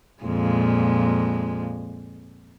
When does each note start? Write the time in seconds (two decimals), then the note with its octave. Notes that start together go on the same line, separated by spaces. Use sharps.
0.24 F2 A#2 G#3